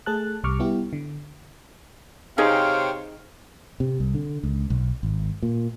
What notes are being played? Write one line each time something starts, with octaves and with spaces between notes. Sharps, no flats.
A3 G#4 A5 F#6
C2 C3 G3 C#6 D6 F6
G3 B3 E4 G4
D3
C3 D#4 G#4 C5 C#5 F5 G5
C3
C2
D3
C#2
B1
G#1
A#2